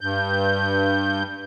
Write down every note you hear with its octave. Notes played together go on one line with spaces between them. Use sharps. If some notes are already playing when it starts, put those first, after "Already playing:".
G2 G6